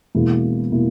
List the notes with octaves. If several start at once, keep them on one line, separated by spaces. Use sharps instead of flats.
E1 E2 B2 A#3 E4
B2 A#3 E4